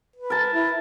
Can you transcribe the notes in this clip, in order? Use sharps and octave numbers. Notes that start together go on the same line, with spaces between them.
B4
A#4 A5
E4